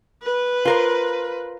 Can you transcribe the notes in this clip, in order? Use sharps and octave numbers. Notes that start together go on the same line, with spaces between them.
B4
F4 A#4 C5